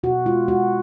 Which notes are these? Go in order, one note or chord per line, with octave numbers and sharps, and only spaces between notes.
B2 F#4
G#3 F4
G#3 F#4